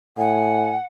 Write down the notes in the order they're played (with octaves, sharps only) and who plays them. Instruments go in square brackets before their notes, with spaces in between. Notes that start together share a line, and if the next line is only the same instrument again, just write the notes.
[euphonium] A2 [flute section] F#5 [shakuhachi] G#5